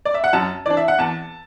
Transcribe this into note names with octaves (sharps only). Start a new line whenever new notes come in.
D5
E5
F#5
F#2 A5
E3 D4 D5
E5
F#5
E2 A5